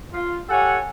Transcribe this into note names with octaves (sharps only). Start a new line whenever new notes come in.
F4
G4 A4 C#5 F#5 G#5